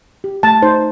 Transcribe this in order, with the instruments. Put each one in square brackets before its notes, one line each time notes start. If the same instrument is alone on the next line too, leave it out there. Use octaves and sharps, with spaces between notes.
[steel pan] G4
A3 A5
D#4 C5